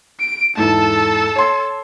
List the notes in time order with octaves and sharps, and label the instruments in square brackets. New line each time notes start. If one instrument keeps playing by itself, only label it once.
[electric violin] D7
[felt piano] E2 G#2 [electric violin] A4 A5
[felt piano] C#5 C6